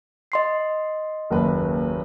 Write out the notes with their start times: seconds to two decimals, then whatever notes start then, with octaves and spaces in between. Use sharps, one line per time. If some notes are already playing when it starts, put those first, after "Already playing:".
0.32 D#5 C6 C7
1.31 F#1 D#2 B4